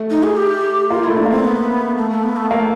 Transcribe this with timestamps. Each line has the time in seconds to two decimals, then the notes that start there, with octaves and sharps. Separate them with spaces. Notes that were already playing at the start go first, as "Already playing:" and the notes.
Already playing: A3
0.10 D#4
0.23 G#4
0.37 G4
0.90 A#3 F4
1.04 A3 E4
1.17 D4
1.26 A#3 C4
1.43 B3
1.97 A3
2.11 A3
2.24 B3
2.37 A3
2.51 A3 A#3